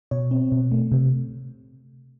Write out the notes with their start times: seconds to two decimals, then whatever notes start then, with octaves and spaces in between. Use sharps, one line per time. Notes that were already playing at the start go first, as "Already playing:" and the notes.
0.11 B2 C#5
0.31 C4
0.52 B2
0.72 A3
0.92 C3